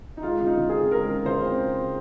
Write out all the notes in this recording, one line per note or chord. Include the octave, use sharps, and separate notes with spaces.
D#4
G#3 F4
C#3
D#4
C#3
C4 G#4
G#3 A#4
C#3
C#3 C5
C4